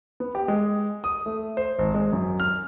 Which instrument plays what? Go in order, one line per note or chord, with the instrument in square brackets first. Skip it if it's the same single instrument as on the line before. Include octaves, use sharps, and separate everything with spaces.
[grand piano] B3
G4
G#3
D#6
A3
C5
G#1
G#3
F#2
F6